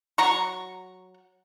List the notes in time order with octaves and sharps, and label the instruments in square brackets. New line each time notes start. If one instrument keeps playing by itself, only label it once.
[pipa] F#3 A#5 C#6